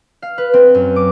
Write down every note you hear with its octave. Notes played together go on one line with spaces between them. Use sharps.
F5
B4
C4
F#2
D6